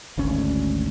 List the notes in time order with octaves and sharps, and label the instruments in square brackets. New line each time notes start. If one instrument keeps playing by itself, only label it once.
[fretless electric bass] G#1 D2 C#4